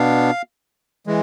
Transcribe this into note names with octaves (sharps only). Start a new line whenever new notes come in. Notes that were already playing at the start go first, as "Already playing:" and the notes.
Already playing: B2 B3 D4 F5
E3 G#3